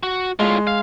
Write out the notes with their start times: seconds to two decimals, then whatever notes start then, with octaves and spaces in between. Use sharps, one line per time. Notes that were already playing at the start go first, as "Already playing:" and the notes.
0.03 F#4
0.39 A2 G#3 F4
0.67 F5